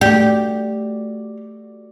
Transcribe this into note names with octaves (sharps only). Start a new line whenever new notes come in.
A3 F#4 G4 D5